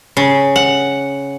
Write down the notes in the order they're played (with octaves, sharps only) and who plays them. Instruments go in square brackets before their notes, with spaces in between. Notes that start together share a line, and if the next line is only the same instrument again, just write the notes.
[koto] C#3
F#5